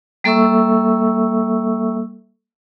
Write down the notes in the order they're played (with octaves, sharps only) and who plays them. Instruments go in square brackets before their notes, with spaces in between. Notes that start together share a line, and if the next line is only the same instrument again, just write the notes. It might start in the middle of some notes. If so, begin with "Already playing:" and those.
[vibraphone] G3 A#3 A4 E5 C#6 E6